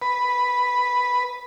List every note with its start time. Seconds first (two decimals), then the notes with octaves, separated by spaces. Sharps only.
0.02 B4